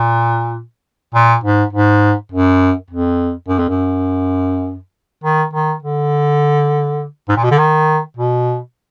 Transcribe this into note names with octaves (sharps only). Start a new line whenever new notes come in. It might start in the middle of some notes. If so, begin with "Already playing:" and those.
Already playing: A#2
A#2
G#2
G#2
F#2
F2
F#2
F2
F#2
D#3
D#3
D3
G#2
A#2
B2
D3
D#3
B2